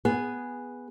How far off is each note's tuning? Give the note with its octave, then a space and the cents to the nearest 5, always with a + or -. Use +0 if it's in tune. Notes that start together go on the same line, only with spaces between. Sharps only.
B3 +0 G#4 -5